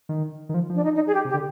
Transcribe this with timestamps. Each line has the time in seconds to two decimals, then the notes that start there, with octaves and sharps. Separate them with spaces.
0.09 D#3
0.49 D#3
0.54 F3
0.70 F3 D4
0.84 D#4
0.95 D#4
1.07 G#4
1.14 G4
1.25 C3
1.29 G4
1.34 D3